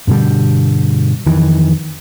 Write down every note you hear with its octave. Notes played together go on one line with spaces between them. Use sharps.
G2 B2 D3 G3
F2 D#3 E3